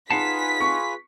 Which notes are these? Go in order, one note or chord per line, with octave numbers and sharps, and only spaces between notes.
D#4 F4 G#4 B4 F#5 A5 B6 C7
C#6